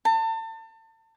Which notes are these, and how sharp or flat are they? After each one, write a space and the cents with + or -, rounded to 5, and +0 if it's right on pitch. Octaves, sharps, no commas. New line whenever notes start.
A5 +35